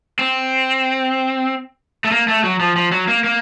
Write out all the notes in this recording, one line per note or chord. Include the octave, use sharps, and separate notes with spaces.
C4
A3
A#3
A3
F#3
F3
F3
F#3
A#3
A#3